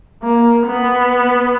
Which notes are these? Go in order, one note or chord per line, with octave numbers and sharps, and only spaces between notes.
A#3
B3